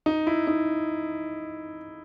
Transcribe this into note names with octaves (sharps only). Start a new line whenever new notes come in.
D#4
E4
D#4